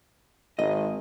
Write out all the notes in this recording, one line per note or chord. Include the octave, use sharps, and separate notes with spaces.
G#1 D#5